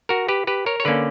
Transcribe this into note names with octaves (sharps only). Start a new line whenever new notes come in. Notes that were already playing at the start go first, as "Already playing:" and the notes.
F#4 A#4
G4 B4
G4 B4
A#4 C#5
C#5
D3 A#3 C#4 B4 D5